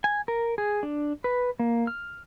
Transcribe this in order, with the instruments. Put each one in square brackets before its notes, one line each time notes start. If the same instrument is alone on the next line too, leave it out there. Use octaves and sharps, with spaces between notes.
[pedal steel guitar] G#5
A#4
G#4
D4
B4
A#3
F6